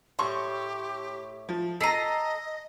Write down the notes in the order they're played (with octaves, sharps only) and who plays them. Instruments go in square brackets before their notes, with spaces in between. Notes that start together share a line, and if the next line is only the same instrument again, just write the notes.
[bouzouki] A2 [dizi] G4 [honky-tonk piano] C6 C#6
[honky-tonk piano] F3
[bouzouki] A4 A#5 [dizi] D#5 [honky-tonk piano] B6 C7 D#7